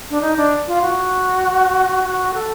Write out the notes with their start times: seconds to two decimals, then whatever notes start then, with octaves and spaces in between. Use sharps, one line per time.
0.10 D4
0.22 D#4
0.37 D4
0.67 F4
0.82 F#4
2.03 F#4
2.34 A4